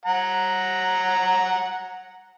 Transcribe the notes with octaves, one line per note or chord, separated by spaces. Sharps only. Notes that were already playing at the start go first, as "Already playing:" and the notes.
F#5 A#5